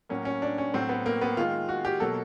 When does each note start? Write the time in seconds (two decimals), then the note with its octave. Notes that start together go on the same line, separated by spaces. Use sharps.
0.09 A2 F#3 A#3 C#4
0.25 C#4
0.42 D4
0.58 C#4
0.73 A2 F#3 A3 C4
0.89 B3
1.06 A#3
1.21 B3
1.37 D#3 G#3 F4
1.69 F#4
1.85 G4
2.00 B2 F#3 A#3 A4